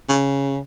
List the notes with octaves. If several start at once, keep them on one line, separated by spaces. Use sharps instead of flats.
C#3